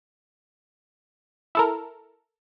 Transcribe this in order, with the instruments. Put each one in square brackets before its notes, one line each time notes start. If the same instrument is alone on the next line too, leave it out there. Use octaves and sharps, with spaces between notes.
[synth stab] E4 A4 A#4